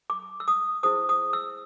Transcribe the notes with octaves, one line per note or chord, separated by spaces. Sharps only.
D6
E6
D#6
E4 G#4 C5 D#6
D#6
E6